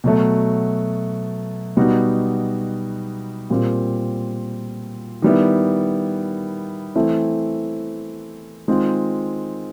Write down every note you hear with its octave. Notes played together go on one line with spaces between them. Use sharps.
B2 F#3 A3
B2 G3 B3 D#4 F#4
A#2 G3 C4 F4
D#3 G3 B3 E4
E3 A3 C4 E4
D#3 G#3 C4 F4